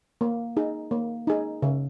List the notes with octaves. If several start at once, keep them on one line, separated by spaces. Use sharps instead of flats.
A#3
D#4 G#4
A#3
D#4 G#4
C#3